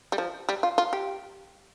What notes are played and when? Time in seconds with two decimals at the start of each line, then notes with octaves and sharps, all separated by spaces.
0.12 G3
0.18 F3
0.49 G3
0.63 F4
0.78 F4
0.93 G4